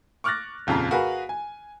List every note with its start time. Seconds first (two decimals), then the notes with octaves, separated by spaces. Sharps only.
0.24 C#6 D6 F6 F#6 A6 A#6
0.67 D#1 F2 C#3 F4 A#5
0.91 F#4 G#4 A#4 B4 F5
1.29 G#5